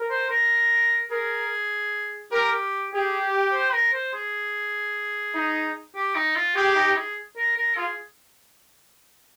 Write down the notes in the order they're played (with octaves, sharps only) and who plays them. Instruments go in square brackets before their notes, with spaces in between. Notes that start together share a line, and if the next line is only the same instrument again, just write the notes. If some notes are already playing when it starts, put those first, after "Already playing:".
Already playing: [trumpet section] A#4
[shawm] C5
A#4
[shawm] G#4 [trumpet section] A#4
[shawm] G4 [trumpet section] A#4
[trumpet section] G4 [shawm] G#4
[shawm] C5
A#4
C5
G#4
[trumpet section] D#4
[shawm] G4
D#4
F4
[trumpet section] G4 [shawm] G#4
[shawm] D#4
G#4
A#4
A#4
[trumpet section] F4 [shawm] G#4